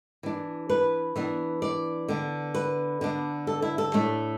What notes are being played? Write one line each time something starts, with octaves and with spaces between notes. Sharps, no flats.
E3 D4
B4
E3 B3 D4
D5
D3 B3 D4
B4
D3 B3 D4
A4
E4
A4
A2 A3 D4